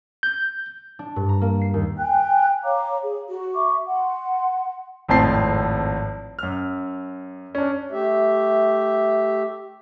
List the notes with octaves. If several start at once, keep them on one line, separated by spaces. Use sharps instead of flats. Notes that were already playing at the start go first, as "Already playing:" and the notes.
G6
D4
G2
A#5
A#3
C7
D#2
G5 G#5 F#6
C#5 F5 A#5 D6
G#4
F#4
E5 C#6 D6
F#5 C6
G#1 F2 A2 C4 A5 C7
F#2 F6
C#4 D4
A3 G4 E5